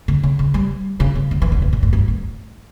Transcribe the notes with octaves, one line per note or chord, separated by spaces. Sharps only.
D3
C#3
C#3
G3
C#3
C#3
D3
E3
D3
C#3
A#2
A2
G2
A2